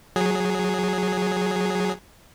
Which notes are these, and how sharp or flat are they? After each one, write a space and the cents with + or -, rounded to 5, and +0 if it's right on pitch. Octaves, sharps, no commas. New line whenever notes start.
F#3 -10 G#4 +0